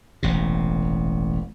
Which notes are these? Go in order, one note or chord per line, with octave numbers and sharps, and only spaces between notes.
E1 A1 C3